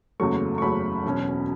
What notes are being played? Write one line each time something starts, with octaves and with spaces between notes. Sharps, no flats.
F#1 E2 C#3 F#3 A3 C#6
C#6
F#1 E2 C#3 F#3 A3 B5
E1 E2 B2 F#3 C#4